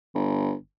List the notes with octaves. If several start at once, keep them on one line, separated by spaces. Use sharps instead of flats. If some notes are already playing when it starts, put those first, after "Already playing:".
G1